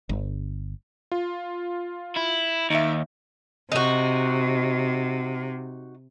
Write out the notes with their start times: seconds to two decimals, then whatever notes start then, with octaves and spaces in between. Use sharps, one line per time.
0.09 G1
1.12 F4
2.16 E4
2.70 D#2 D#4 E5
3.72 C3 D#4 F#4